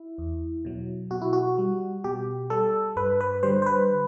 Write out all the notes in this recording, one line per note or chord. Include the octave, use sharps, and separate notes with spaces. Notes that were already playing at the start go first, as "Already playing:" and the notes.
Already playing: E4
E2
B2 F#3
B2 F#4
E4
F#4
G3
B2 G4
G3 A4
G2 B4
B4
D3 G3 C5
C5
B4